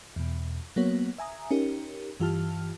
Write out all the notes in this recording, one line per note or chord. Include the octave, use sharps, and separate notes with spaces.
E2 B2
F#3 A#3 B3 F#4 C#5
E5 G#5 A#5 D#6
C#4 D#4 G4 A#4
G2 E3 F4 G4 A5 F6